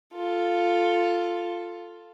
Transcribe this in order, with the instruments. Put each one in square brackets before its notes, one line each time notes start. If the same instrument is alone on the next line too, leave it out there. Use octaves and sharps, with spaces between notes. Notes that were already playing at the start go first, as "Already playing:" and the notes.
[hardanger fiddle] F4 A4